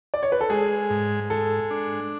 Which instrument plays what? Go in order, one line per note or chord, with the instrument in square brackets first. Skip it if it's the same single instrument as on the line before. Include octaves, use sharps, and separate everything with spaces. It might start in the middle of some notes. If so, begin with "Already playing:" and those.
[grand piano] D5
C#5
B4
A4
[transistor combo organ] G#3 [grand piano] G#4
[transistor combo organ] G#2
[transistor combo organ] G#3 [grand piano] A4
[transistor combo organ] D4